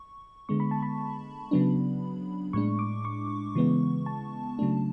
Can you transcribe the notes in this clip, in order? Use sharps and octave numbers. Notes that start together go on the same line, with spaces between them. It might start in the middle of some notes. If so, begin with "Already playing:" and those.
Already playing: C#6
D3 G#3 B3 C#6
B5
A5
B5
C#3 F#3 B3 D4
A2 G#3 D4 C#6
D6
C#6
C#3 E3 G#3 B3
A5
C#3 F#3 A3 D4